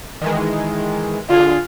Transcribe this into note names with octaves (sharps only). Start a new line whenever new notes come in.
D#3 E3 G#3
D3 F4 G#4